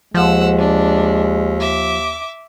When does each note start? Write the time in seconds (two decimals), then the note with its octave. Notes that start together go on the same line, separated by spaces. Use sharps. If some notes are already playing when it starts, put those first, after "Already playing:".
0.14 D#2 F3 G#3 F#5 E6
0.58 D4
1.60 E5 D6